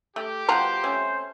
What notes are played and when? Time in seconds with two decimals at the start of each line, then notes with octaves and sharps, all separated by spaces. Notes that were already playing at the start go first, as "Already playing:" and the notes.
0.16 A3 G4
0.49 B2 G3 C#4 F4 C5 F#5 A#5
0.83 C3 A3 C#4